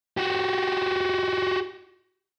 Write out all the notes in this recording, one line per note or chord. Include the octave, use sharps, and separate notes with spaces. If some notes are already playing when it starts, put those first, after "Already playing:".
F#4 G4